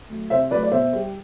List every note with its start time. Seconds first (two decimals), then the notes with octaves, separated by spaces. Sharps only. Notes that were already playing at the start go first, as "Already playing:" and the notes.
0.10 F#3 A3
0.30 C3 C5 E5
0.51 F#3 B4 D5
0.55 A3
0.64 D5
0.72 B2 C5 E5
0.93 G3